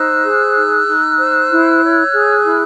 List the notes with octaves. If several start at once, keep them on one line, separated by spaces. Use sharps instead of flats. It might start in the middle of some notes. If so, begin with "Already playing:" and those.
Already playing: D#4 C5 E6 F#6
G#4
D#4
D#4
C5
E4
C#5
G#4
E4